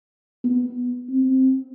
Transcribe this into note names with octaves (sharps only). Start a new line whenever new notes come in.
B3
C4